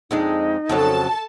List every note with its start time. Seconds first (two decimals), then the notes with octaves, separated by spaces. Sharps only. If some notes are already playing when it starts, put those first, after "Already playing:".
0.11 F2 G#3 D4 D#4
0.69 F2 C#3 F#3 A4 A5